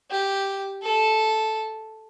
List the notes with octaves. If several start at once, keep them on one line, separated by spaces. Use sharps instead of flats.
G4
A4